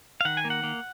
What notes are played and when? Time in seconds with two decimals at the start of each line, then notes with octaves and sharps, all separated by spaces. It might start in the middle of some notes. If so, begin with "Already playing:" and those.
0.21 F5
0.25 D#3 F#5
0.37 G#5
0.45 A#3
0.50 F#5
0.63 A#3